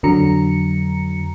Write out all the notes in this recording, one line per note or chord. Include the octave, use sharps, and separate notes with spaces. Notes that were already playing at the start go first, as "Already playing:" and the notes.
F2 D3 F#3 A#5 C#7